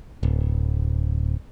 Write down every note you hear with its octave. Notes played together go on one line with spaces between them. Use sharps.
D1